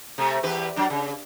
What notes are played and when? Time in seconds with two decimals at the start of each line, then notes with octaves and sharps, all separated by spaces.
0.18 C3 A3
0.43 E2 G4 B4
0.76 F#3 D4
0.90 C#3